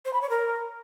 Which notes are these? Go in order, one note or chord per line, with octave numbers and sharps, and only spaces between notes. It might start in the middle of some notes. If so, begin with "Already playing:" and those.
C5
B5
C#5
A#4